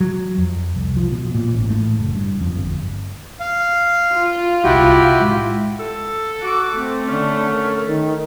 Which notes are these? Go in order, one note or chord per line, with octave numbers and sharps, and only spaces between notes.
F#3
F2
C2
F3
B2
A#2
A1
A2
F#1
G2
F2
G1
F5
F4
D#1 C2 E4 F#4 G4
A2 G#3
A4
F#4 D6
A3 C4
D3 C#4
A#4
D#3